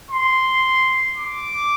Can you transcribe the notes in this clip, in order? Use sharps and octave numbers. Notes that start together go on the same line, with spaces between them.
C6
D6